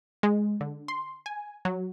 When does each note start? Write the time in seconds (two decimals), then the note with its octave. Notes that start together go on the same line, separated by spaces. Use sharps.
0.23 G#3
0.61 D3
0.88 C6
1.26 G#5
1.65 F#3